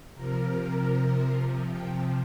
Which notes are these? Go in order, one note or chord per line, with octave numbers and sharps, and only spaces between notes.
C3 F3 A#4
G5